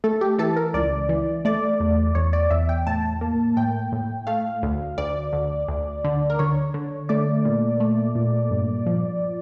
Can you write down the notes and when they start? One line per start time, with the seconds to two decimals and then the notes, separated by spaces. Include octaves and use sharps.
0.04 A3 A4
0.21 G4
0.39 E3 A4
0.56 A#4
0.74 C#2 D5
1.09 E3
1.45 A3 D5
1.80 E2
2.15 E2 C#5
2.33 D5
2.51 E2 E5
2.69 G5
2.87 A2 A5
3.21 A#3
3.57 A2 G5
3.92 A2
4.27 A3 F5
4.63 D2
4.98 D2 D5
5.33 D2
5.68 D2
6.04 D3
6.30 A#4
6.39 D3 C#5
6.74 D3
7.09 A3 D5
7.45 A#2
7.80 A3
8.15 A#2
8.51 G2
8.86 F3